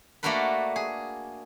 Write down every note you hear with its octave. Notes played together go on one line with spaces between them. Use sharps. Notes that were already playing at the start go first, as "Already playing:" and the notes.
A3 A#3 D4 F#4 A#4 B4
G#4